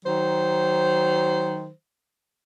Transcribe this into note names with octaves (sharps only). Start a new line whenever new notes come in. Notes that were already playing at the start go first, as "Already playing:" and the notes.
D#3 F#3 C5